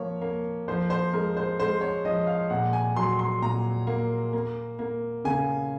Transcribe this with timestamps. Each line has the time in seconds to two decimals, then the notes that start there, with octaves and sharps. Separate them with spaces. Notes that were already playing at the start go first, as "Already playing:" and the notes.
Already playing: F3 A#3 C#5
0.21 A#3
0.68 F3 C5
0.90 C5
1.13 G#3 A#4
1.37 C5
1.59 G#3 C5
1.81 C#5
2.05 F3 D#5
2.27 F5
2.50 A#2 F#5
2.73 G#5
2.95 F#3 C6
3.19 C6
3.42 A#2 A#5
3.87 A#3
4.33 A#3
4.79 A#3
5.25 C#3 G#5